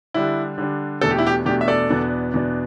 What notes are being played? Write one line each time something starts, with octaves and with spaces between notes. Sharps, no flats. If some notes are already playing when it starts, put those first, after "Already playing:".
D3 G3 D4 E4
D3 G3 D4
E2 B2 A3 D4 A4
G4
E4
G4
E2 B2 A3 D4 G4
E5
A4 D5
E2 B2 B3 D4
E2 B2 B3 D4